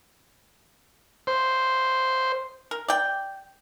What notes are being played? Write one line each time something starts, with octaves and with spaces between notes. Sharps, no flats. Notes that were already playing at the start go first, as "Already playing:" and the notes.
C5
A#4
D5 G5